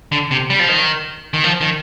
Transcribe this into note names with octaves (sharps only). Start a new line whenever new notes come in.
D3
C3
G3
F3
D#3
D#3
F3
D#3